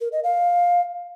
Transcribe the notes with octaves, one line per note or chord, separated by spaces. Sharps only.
A#4
D#5
F5